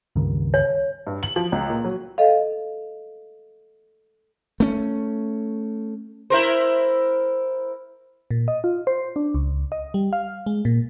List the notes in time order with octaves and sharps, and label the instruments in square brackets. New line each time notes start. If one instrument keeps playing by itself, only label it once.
[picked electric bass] C#2 G2 D#3
[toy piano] C#5
[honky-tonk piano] G2
F#7
F3
C#2
A#2
F#3
[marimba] A4 D#5 F5
[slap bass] A3 C#4
[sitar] E4 A#4 C5
[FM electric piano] A#2
D#5
F4
C5
D4
C#2
D#5
G3
F5
G#3
A#2